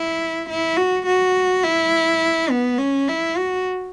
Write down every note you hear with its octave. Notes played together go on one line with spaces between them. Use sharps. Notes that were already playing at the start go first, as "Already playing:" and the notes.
Already playing: E4
E4
F#4
F#4
E4
B3
C#4
E4
F#4